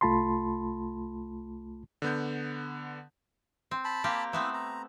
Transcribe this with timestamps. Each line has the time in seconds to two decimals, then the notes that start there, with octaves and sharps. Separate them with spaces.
0.01 C2 A3 F4 A5 B5 C6
2.02 D3 B3 G6
3.71 C4
3.85 A5 B5
4.04 A#3 C4 G4
4.33 A3 B3 C4 E4 B4
4.54 A#5